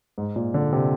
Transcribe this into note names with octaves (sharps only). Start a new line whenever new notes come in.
G#2
A#2
D3
C3